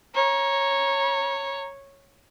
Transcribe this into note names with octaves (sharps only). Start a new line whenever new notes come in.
C#5 A#5